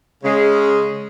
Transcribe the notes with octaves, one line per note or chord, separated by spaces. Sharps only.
C#3 G#3